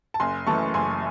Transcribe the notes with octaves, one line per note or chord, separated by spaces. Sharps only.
A5
F#1 G#5 C6
F#2 E3 A3 A5 C#6
F#1 G#5 C6